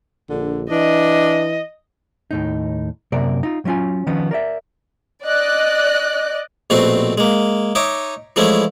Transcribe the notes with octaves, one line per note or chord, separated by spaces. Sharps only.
A#1 D3
E3 D4 D#5
D#2 A2 D#4
F#2 C3 A#3 A#4 D5
D#4 F4
F#3 G3 C#4 F4 G#5
D#3 F3 B3 C#4
A#4 D5 E5
D5 D#5 F#6
A#1 B2 A3 C4 F#4 C6
G#3 A#3
D#4 C#5 D#5 E5 D6 D#6
E3 F3 G#3 A3 C#4 E4